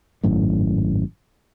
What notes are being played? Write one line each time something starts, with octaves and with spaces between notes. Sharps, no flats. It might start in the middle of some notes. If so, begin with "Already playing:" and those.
G#1 F#2 A2